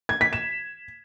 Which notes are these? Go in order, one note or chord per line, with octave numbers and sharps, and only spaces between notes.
G#6
B6
E7